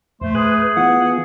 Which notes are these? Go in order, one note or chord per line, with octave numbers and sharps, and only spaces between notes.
F2 A#2 A3 C5
G#4 B4 D#6 F#6
E3 B3 F4 F#5